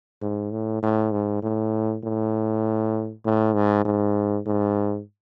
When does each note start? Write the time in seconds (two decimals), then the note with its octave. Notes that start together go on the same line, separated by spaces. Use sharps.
0.22 G#2
0.52 A2
0.83 A2
1.12 G#2
1.43 A2
2.04 A2
3.25 A2
3.55 G#2
3.85 G#2
4.46 G#2